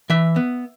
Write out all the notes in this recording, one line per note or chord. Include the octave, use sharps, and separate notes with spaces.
E3 E5
B3